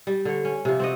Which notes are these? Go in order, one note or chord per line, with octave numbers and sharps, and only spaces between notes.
G3
D3 C#5
C#4
C3 F3
C4 F#4 D#5